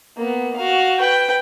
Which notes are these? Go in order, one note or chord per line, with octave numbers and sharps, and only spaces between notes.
A#3 B3
F#4 F5
B4 G5